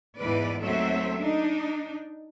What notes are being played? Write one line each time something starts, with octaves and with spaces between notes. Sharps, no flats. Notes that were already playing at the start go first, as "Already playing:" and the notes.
E2 G#2 E3 B4 D5
D#2 F#3 A3 C4 A4 E5
D4 D#4